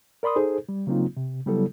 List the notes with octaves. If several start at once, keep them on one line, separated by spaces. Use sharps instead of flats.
A#4 D5 B5 C6 D#6
D#4 G#4 A4 C5
G3
C#3 F#3 A#3 C4 D#4 F4
C3
C#3 F#3 G3 B3 E4 A4